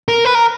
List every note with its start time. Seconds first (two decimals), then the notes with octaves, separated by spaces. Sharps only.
0.08 A#4
0.25 B4
0.35 A#4